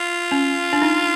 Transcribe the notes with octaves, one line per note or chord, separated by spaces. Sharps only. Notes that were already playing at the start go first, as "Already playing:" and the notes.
Already playing: F4
C#4
D4
D#4